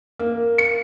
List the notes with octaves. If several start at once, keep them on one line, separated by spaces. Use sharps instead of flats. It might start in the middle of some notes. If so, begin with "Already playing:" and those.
A#3
C#7